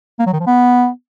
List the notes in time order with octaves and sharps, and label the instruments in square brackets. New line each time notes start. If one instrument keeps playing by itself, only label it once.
[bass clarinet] A#3
F#3
D#3
F3
B3